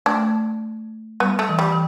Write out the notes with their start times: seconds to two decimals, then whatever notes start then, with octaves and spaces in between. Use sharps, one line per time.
0.06 A3 D4
1.20 G3 B3
1.39 A3
1.49 E3
1.59 G3
1.73 E3